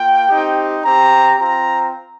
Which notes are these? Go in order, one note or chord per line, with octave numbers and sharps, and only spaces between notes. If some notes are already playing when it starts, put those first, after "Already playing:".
Already playing: A#3 F4 G5
C4 D#4 G4
C4 G4 A#5
C4 F4 A#5